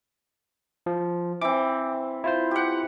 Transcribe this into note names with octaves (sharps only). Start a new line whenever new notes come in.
F3
E3 C4 D6
E4 F4 C5
G4 F#5